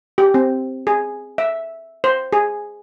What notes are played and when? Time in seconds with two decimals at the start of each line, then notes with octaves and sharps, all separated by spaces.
0.18 G4
0.34 C4
0.87 G#4
1.38 E5
2.04 C5
2.33 G#4